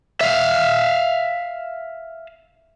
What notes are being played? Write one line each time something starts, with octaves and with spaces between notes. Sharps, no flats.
E5 F5